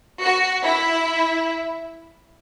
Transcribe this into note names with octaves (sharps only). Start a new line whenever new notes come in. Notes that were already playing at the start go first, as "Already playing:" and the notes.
F#4
E4